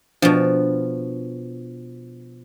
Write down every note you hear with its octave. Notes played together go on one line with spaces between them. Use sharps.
B2 F3 D4